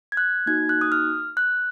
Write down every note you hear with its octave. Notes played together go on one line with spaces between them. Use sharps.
G#6
F#6
A#3 D#4 F#4 G#6
F#6
D#6
F6
F#6